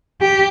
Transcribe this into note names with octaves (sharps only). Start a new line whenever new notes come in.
G4